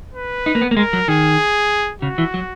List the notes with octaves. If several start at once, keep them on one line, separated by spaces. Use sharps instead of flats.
B4
D#4
A#3
B3
A#3
G#3 A#4
F#3
D#3 G#4
C#3 F#4
E3
F#3